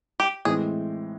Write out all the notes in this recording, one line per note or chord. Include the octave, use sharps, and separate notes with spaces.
G4
A2 E3 G#3 C4 G#4